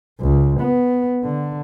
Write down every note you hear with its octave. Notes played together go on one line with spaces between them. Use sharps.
C#2
B3
D3